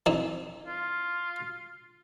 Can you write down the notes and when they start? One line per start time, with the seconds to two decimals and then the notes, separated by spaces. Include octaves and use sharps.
0.06 E3 C4 D#4
0.66 F4